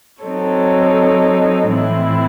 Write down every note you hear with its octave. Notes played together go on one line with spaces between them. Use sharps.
F#3 C4 D#4 A4 C#5
A2 E3 C4 E4